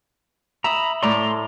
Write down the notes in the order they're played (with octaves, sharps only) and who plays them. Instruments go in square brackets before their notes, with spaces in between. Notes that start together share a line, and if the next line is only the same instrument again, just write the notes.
[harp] E5 D#6 [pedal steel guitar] A#5 B5
[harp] A2 A3 D5 [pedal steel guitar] A4 A#5 C6